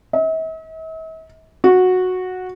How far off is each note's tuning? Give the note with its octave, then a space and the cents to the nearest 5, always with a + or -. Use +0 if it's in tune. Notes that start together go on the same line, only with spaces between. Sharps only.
E5 -45
F#4 -10